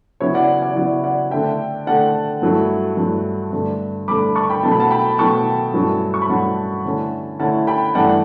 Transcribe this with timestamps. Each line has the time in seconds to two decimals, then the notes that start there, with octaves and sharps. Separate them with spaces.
0.20 C#3 F#3 B3 E4 C#5 E5
0.35 D5 F#5
0.62 D5 F#5
0.76 C#3 F#3 B3 E4 D5 F#5
1.04 D5 F#5
1.31 D3 A3 D4 E5 G5
1.87 D3 A3 D4 F#5 A5
2.42 G2 F#3 A3 E4
2.97 G2 F#3 A3 E4
3.52 G2 D3 A3 D4
4.08 G2 D3 A3 D4 B5 D6
4.35 A5 C#6
4.50 G5 B5
4.63 B2 F#3 A3 A5
4.72 B5
4.80 F#5 A5
4.91 G5 B5
5.18 B2 F#3 A3 A5 C#6
5.74 G2 F#3 A3 C#4 E4
6.14 C#6
6.22 B5
6.29 G2 F#3 A3 C#4 E4 F#5 A5
6.85 D3 A3 C#4 E4
7.40 D3 A3 C#4 E4 F#5 A5
7.67 G5 B5
7.95 G2 E3 A3 D4 F#5 A5